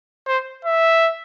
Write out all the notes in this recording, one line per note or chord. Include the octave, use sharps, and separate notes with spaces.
C5
E5